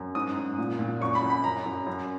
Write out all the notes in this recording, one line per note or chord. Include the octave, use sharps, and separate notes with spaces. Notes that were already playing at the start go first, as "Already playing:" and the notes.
Already playing: F#2
G#2 D#6
G#2
A#2
A#2
F#2 C#6
B5
F#2
B5
F#2 A#5
F#2
F#2